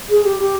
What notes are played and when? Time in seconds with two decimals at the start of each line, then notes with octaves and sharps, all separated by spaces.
0.09 G#4
0.24 G4
0.37 G4